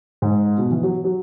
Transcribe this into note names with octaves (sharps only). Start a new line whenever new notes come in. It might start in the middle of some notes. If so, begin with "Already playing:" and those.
G#2
B2
E3
F#3
F#3